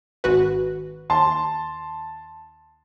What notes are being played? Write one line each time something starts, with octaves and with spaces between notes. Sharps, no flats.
G#1 F#4 B4
D#2 A5 C6